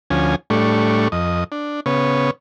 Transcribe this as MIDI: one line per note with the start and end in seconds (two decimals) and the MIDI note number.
0.10 0.35 38
0.10 0.35 53
0.10 0.35 61
0.10 0.35 80
0.50 1.08 45
0.50 1.08 55
0.50 1.08 57
0.50 1.08 62
0.50 1.08 85
1.12 1.44 41
1.12 1.44 75
1.52 1.80 62
1.86 2.30 49
1.86 2.30 59
1.86 2.30 73